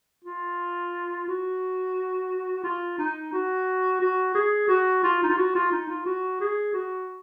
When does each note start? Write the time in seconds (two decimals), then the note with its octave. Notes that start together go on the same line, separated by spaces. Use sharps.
0.25 F4
1.28 F#4
2.64 F4
2.99 D#4
3.33 F#4
4.01 F#4
4.35 G#4
4.69 F#4
5.04 F4
5.23 D#4
5.30 F4
5.37 F#4
5.55 F4
5.72 D#4
5.89 F4
6.06 F#4
6.41 G#4
6.74 F#4